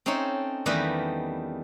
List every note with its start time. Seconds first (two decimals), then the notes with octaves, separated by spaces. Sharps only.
0.06 C4 C#4 D#4 A4 C#5 E5
0.66 E2 D#3 G3 A3 B4 D#5